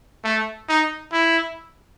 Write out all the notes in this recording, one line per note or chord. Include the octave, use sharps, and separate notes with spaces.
A3
D#4
E4